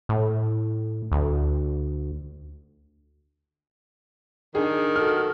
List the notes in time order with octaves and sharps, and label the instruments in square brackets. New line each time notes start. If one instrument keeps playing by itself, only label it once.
[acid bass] A2
D2
[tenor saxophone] D#3 [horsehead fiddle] D4 [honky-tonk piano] G#4
[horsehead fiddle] F#4 A4 [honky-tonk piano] F6